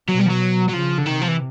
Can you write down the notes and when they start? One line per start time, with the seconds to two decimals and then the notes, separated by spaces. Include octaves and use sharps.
0.09 B2 F#3
0.19 G3
0.26 F3
0.30 F#3
0.69 F#3
0.73 C#3 F3
0.98 D3
1.06 C3 D#3
1.22 F3
1.28 E3